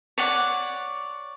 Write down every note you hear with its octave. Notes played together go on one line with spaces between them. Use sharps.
C#5 D5 F#5